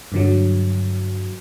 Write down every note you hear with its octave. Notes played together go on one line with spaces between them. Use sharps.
G2 D3 F#3